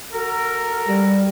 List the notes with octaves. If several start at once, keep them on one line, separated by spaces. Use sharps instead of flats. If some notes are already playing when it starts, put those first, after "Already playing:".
F#4 A4 A#4
G3